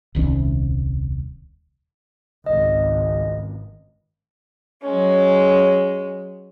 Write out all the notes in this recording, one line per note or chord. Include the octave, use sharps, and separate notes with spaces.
D#1 C2 D#3 C#4
G#1 C#2 D#5
F#3 G#3 C#4